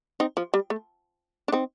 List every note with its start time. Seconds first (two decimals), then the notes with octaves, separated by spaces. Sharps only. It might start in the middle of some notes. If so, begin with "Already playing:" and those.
0.20 C4 D#4
0.37 F3
0.54 G3
0.70 A3
1.48 D4
1.52 C4 D#4